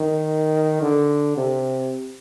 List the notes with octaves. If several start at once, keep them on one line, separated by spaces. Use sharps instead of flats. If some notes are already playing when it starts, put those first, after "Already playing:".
Already playing: D#3
D3
C3